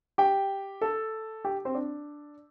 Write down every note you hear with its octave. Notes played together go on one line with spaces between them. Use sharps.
G4 G5
A4 A5
G4 G5
C4 C5
D4 D5